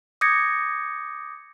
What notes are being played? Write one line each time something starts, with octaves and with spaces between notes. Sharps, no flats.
D6 D#6 G6 G#6 A#6 C#7